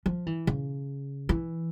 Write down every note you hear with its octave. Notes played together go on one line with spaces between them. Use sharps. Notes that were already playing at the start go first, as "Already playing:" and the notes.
F3
E3
C#3
E3